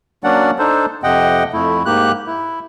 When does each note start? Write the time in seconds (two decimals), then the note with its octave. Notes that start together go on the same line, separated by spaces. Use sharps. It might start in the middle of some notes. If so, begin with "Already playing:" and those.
0.24 F#3 A#3 C#4 D4 D5 F#5
0.59 D4 D#4 A4 C5
1.03 F2 C3 D#5 F#5 G5
1.53 F2 A3 E4
1.86 G#2 A#3 G4 F#6
2.27 E4